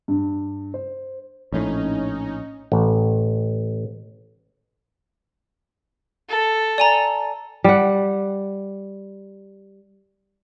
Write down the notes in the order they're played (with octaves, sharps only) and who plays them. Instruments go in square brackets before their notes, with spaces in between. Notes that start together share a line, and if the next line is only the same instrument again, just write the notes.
[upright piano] G2
C5
[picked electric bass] A#1 A2 [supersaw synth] C#4 D#4
[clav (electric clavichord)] A1
[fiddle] A4
[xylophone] D5 G#5 A#5
[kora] G3 F#5